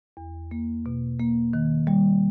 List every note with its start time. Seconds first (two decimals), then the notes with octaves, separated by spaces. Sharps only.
0.17 E2
0.51 A#3
0.86 B2
1.20 A#3
1.53 D#3
1.87 G3